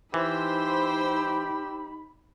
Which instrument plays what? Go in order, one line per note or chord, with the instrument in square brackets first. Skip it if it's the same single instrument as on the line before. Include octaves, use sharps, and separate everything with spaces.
[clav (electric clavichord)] E3 [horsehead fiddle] D#4 B5 [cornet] G4 [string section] C5 E6